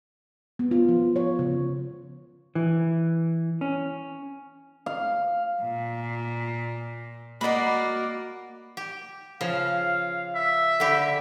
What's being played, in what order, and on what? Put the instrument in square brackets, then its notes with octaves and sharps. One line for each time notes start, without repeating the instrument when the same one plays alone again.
[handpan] B3
F4
F3
C#5
C#3
[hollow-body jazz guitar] E3
C#4
[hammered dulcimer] F5
[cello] A#2
[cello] A#3 [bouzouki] F#4 D#5 F#5 [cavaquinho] D5 B5
[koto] G4
[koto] C#3 F3 [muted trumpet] F5
[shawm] E5
[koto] D3 G4 [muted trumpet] B5